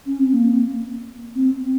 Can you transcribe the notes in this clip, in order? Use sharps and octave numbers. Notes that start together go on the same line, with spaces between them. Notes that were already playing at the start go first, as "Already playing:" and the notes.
C#4
C4
A#3
C4